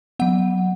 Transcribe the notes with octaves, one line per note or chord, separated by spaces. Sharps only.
F#3 B3 F#5